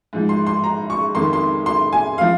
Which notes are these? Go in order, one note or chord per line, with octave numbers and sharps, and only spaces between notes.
G#2 F3
C6
C6
A#5
C#6
F2 D#3 C6
C6
C6
G#5
F3 F5